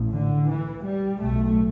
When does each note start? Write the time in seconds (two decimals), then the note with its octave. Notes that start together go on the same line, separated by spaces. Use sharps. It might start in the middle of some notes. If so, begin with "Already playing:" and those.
Already playing: A1 A2
0.11 D3
0.48 E3
0.85 G3
1.21 B1 A2 A3